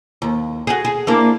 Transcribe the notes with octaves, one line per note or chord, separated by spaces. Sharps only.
D#2
F#4 G#4
G#4
A#3 D4 E4